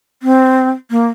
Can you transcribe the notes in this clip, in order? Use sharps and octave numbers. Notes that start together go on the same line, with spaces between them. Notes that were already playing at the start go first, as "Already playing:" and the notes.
C4
A#3